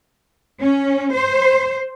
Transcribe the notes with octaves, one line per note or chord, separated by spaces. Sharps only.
C#4
C5